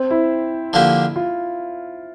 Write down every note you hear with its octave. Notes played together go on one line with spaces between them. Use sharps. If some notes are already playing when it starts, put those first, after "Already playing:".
Already playing: C4
E4
D3 F3 A#3 D4 G4
F4